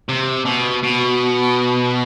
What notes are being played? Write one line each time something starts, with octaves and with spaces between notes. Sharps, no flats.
C3
B2
B2